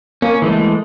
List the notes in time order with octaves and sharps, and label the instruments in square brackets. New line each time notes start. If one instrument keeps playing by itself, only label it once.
[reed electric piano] A#3 [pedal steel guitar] C#4
[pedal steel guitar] E3 G#3 A3